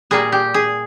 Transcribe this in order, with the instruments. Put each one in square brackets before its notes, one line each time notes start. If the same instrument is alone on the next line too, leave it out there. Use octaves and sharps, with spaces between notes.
[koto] A#2 G3 A#3 G#4
G4
G#4